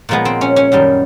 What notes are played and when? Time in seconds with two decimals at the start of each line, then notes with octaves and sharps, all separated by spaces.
0.09 A#2 F3 G#3 B3
0.25 C4
0.41 C#4
0.56 C#4
0.72 F#2 D#3 G3